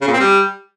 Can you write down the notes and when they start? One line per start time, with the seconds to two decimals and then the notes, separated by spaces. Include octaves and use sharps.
0.01 C#3
0.08 A#2
0.14 C4
0.20 G3